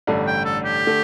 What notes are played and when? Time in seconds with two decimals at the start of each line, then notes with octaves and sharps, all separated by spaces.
0.07 A1 G2 D3 A3
0.27 G5
0.45 A4
0.65 G4
0.86 D3 A3